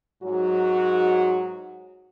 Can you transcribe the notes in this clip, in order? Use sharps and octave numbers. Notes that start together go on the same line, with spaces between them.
G#2 F#3 F#4